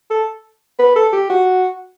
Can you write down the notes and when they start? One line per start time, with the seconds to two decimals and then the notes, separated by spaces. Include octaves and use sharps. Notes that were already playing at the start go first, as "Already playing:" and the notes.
0.11 A4
0.79 B4
0.96 A4
1.13 G4
1.30 F#4